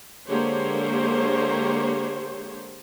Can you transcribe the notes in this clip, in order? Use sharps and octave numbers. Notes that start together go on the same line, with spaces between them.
D3 G#3 A#3 G4 C5 C#5